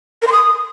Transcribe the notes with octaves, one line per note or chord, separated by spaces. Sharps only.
A#4
C6
D#6